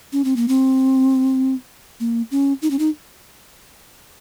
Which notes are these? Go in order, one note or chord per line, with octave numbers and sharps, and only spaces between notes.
C#4
C4
A#3
C4
A#3
C#4
D#4
C#4
D#4